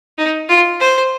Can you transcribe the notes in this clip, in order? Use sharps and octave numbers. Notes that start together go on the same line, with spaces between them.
D#4
F4
C5